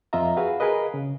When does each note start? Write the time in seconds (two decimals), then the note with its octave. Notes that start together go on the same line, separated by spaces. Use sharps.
0.13 F2 C4 F4 D#5 E5 A#5
0.37 F#4 G#4 B4 F5
0.60 G#4 A#4 B4 D#5
0.94 C#3